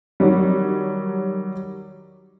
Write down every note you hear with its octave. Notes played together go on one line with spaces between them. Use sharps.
D#3 F#3 G3